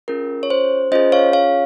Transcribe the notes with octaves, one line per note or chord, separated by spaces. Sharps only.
C#4 F4 G#4 A#4
C#5
C5
C#4 F4 G#4 C5 D#5
C#5 F5
C#5 F5